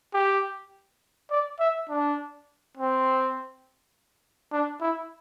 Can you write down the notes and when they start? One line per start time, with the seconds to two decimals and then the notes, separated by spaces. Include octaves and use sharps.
0.14 G4
1.30 D5
1.59 E5
1.89 D4
2.77 C4
4.52 D4
4.81 E4